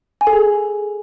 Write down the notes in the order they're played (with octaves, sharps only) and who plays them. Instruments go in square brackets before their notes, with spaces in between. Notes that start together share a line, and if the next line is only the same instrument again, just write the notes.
[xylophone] G#5
A4
G#4